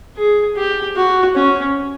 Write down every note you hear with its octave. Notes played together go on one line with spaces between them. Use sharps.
G#4
G4
F#4
C#4